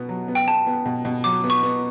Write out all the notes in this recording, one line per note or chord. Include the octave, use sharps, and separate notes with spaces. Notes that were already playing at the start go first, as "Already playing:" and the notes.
Already playing: B2 B3
F#3
B3
G5
B3 A5
B3
B2
B2
F#3 D6
B3
C#6
B3